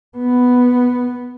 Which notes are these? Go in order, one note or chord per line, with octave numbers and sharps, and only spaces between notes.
B3